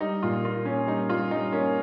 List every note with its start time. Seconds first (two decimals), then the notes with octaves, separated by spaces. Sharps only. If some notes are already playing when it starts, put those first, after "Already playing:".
0.01 G3 D#4
0.23 A#2 F4
0.44 A#3 F4
0.65 A#3 C#4
0.87 G3 D#4
1.09 G3 F4
1.31 G3 D#4
1.52 A#3 C#4